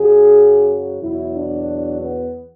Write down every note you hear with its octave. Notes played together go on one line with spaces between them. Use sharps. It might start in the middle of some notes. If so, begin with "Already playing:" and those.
Already playing: F#2 C#3 F#3 G#4
E2 B2 F#3 E4
D4
B3